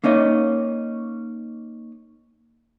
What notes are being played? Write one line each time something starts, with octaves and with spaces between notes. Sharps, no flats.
A#3 C#4 D#4 D#5